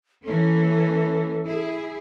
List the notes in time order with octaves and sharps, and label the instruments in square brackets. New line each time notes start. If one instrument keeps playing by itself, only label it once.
[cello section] E3 A#3 C#4 [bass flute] A4
[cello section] E4 G#4